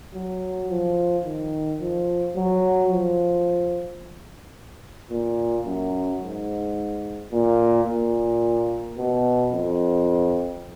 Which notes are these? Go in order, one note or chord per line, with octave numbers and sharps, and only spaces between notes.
F#3
F3
D#3
F3
F#3
F3
A#2
F#2
G#2
A#2
A#2
B2
F2